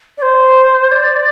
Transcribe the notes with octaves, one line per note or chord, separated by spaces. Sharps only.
D5
C5
D5